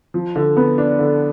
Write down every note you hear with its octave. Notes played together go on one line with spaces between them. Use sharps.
F3
D3
B3
D4
D3